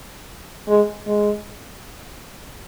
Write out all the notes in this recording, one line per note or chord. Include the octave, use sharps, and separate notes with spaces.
G#3
G#3